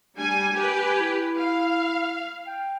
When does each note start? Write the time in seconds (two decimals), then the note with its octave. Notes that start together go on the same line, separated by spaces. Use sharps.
0.17 G3 D4 G#5
0.54 G4 B4 G#5
1.00 E4
1.36 F5
2.47 G5